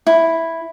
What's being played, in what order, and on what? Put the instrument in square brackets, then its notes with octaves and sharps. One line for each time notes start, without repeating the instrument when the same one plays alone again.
[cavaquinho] E4